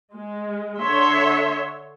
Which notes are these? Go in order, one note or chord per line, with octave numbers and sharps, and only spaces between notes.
G#3
D3 C#5 E5 C6